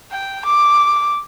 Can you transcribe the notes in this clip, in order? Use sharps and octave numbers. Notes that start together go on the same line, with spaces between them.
G5
D6